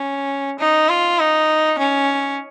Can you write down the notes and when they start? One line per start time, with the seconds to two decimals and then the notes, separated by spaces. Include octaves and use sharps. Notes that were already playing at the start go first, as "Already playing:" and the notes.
Already playing: C#4
0.59 D#4
0.89 F4
1.19 D#4
1.79 C#4